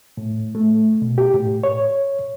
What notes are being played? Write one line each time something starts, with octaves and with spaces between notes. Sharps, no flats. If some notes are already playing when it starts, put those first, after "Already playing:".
A2
A3
B2
G4
A2
C#5